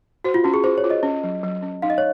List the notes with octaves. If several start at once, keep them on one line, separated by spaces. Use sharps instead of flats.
F#4 C5
F4
C#4 F#4
G#4
F4 C5
C#5
F4
D#5
C#4
F#3
F#3
C#4
D#4 F5
D#5
C#5